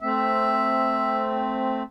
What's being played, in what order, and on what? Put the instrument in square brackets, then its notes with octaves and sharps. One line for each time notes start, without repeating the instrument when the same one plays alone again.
[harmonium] A3 C4 [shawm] E5